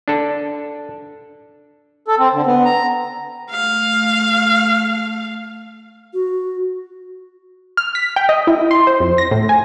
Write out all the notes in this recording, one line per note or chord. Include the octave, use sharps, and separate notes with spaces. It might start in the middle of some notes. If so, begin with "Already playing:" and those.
D4 A4
A4
C4
D3
B3
A#5
A3 F5
F#4
F6
B6
G5
D#5
E4
C6
C5
F2
A#6
A2
G#5